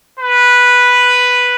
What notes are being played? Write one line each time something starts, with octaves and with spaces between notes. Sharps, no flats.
B4